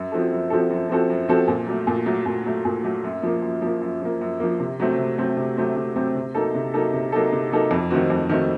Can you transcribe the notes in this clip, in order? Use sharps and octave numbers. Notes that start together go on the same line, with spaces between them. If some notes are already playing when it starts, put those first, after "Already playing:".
Already playing: F#2
F3 C4 F#4 A4
F#2
F3 C4 F#4 A4
F#2
F3 C4 F#4 A4
F#2
F3 C4 F#4 A4
A#2
F#3 A3
A#2
F#3 A3
A#2
F#3 A3
A#2
F#3 A3
F#2
F3 A#3
F#2
F3 A#3
F#2
F3 A#3
F#2
F3 A#3
C3
F#3 A3 C4
C3
F#3 A3 C4
C3
F#3 A3 C4
C3
F#3 A3 C4
C3
F#3 A#3 D#4 A4
C3
F#3 A#3 D#4 A4
C3
F#3 A#3 D#4 A4
C3
F#3 A#3 D#4 A4
F2
D#3 A3 C4 F#4
F2
D#3 A3 C4 F#4